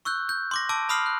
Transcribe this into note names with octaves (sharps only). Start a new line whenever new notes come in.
C#6 E6 F#6 G6
G6
C6 D6 A#6
A5 D6 E6 D7
A5 B5 D#6 F6 C7 F#7
F#6